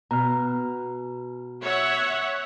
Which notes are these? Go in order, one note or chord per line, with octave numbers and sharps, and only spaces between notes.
B2 A#5 F6
C#5 E5 F#5